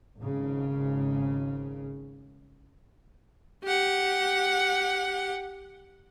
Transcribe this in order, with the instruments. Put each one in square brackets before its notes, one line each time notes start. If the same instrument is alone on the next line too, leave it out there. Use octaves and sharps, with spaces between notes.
[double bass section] G#1 C#3
[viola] G4 F#5